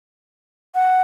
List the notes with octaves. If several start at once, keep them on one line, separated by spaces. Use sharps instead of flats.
F#5